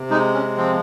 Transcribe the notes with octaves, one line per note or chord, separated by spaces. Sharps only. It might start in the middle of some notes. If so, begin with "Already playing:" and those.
Already playing: C3
G#3 D#4
C#4
F3 C4